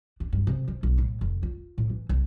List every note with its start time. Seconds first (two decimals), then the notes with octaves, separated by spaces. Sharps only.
0.20 D4
0.33 G2
0.47 C3
0.68 F3
0.83 B1
0.98 A2
1.21 F1
1.43 F4
1.78 A2
1.90 E3
2.09 C2